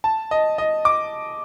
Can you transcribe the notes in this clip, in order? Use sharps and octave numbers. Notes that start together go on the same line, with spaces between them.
A5
D#5
D#5
D6